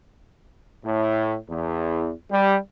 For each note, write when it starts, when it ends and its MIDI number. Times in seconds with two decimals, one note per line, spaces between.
0.84 1.36 45
1.49 2.12 40
2.30 2.56 55